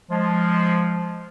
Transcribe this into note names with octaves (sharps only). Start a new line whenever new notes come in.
F3 G#3